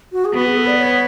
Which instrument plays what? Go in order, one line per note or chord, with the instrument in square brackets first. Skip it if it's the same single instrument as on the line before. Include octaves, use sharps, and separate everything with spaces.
[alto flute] F#4
G#4
[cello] B3 [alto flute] F#4
[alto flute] G#4
A4
D5
C#5